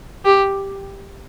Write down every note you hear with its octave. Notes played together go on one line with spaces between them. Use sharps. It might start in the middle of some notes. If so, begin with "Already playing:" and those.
G4